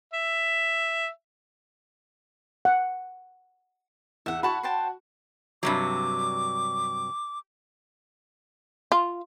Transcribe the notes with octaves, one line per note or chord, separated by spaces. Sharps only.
E5
F#5
E2 E5 F#5
E4 F#4 A5 B5 C#6
C5 G5 A5
G2 C3 F#3 D6
F4